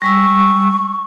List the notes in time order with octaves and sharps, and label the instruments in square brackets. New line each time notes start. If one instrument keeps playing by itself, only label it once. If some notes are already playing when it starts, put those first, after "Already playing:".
[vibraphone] G3 G#3 E6 [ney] C#6